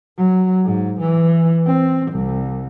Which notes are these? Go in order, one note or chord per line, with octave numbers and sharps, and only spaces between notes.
F#3
G#2
E3
C4
C2